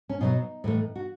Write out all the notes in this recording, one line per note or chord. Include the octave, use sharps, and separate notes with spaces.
C#4
B2 F#3 B3 D#4
A2 E3 A3
F#4